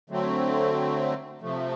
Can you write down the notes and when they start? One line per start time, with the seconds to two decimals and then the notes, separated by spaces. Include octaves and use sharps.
0.10 D3 F#3 A3 C4
1.41 C3 F3 A3